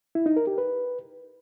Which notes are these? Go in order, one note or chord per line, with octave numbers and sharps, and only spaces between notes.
E4
D#4
A#4
G4
B4